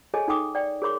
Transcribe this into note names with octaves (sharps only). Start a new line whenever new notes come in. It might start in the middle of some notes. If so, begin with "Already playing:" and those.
G#4 A4 C#5 D#5 G#5
D#4 A4 G5 D6 D#6
D5 G5
G#4 A#4 C#5 C6 D6